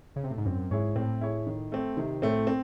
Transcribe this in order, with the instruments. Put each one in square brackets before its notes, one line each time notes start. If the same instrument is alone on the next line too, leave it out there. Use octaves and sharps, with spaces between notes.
[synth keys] C#3
C3
A2
G#2
[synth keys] F#2 [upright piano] C4
[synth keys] G#2 [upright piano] E4 G#4 C#5
[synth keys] A2 [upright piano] C4
[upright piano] E4 G#4 C#5
D#3
A3 C4
[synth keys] C3 [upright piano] D#3
[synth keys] A2 [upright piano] A3 C4
[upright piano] C4